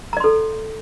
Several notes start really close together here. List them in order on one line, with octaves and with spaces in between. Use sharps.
A#5 D5 C6 A4